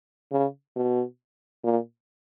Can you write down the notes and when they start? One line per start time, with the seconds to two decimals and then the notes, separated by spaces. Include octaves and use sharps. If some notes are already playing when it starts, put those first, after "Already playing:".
0.32 C#3
0.76 B2
1.64 A#2